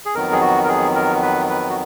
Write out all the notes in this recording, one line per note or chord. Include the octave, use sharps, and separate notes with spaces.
G#4
F2 D#3 F#3 B3 A#4
G#4
F#4
A#4
G#4
A#4
B4
B4
F#4